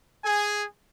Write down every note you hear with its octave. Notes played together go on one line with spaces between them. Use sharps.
G#4 G#5